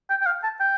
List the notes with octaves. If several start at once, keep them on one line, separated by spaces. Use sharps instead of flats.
G5
G5
F5
A5
G5